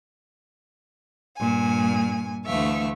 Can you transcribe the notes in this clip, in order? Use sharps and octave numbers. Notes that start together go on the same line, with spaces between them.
G2 A#2 G#5
D2 E3 A3 E5 F5 C#6